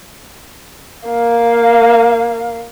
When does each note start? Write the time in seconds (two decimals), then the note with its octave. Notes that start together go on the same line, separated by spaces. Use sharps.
1.08 A#3 F5